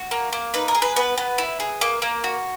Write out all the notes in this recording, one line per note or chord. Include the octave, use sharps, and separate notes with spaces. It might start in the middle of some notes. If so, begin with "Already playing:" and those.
Already playing: F#4
A#3
A#3
D#4 B4
A#4
G#4
B4
B3 B4
B3
E4
G#4
A#3
A#3
F#4